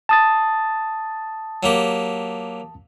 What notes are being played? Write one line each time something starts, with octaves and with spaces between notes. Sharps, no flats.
A5 D#6 A6
F#3 A#3 G4